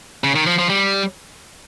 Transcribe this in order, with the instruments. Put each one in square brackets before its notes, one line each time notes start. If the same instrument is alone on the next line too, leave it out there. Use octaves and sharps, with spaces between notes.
[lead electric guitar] C#3
D#3
F3
F3
G3